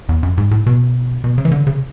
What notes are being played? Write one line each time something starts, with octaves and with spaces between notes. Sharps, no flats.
E2
F#2
G#2
A2
B2
B2
C#3
E3
D3
C#3